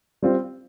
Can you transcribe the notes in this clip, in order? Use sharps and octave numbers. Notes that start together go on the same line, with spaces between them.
G3 C4 F4